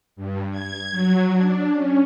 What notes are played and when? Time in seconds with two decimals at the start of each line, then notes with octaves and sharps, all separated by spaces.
0.16 G2
0.51 G#6
0.91 F#3
1.31 D4
1.73 C#4